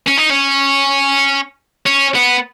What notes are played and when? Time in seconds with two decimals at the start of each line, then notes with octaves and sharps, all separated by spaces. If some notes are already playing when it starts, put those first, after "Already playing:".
0.08 C#4
0.18 D#4
0.30 C#4
1.86 C#4
2.15 B3